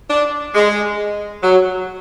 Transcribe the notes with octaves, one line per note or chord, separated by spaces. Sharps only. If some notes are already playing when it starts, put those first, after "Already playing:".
D4
G#3
F#3